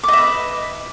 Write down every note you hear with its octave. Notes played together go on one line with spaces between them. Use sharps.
B4 D#5 E5 D6